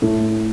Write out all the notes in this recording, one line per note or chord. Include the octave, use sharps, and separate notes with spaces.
A2 A3